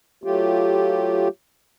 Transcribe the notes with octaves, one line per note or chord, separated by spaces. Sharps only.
F#3 A3 F4 G4